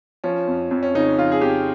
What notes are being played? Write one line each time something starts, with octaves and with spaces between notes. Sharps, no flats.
F3 C#4
F2
F2
C#4
C#3 D#4
F3 F4
G#4
F2 G4